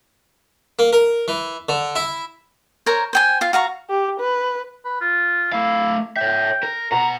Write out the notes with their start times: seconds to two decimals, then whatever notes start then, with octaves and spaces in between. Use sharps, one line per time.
0.79 A#3
0.93 A#4
1.28 E3
1.69 D3
1.96 E4
2.86 A#4 C5 C#5 A#5
3.13 C5 G5 G#5
3.41 F4 F5
3.53 F#4 F5 A#5 C#6
3.90 G4
4.20 B4
4.85 B4
5.01 F4
5.52 A3 E4 F5
6.17 C#5 E5 G5
6.63 A#4
6.92 B2 F#5 A#5